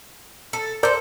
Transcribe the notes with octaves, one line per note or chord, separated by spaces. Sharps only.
A4
A4 A#4 C5 D5 G6